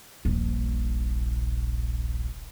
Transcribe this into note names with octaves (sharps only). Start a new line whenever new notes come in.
D#1 A#1